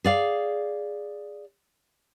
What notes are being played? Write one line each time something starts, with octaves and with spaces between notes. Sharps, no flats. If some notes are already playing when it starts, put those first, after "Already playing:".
G#4 D5 F5